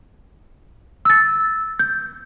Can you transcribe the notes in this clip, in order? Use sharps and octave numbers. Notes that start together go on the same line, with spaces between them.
E6 A6
G6